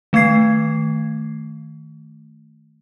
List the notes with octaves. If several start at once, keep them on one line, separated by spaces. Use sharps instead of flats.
D#3 A3 D6 G#6 C7